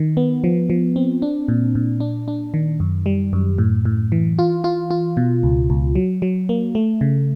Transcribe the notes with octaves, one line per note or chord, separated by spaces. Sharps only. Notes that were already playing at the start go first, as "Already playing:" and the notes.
Already playing: D#3
B3
F3
F3
C4
D4
A#2
A#2
D4
D4
D#3
F#2
G3
F#2
A2
A2
E3
F4
F4
F4
B2
C#2
C#2
F#3
F#3
A#3
A3
C#3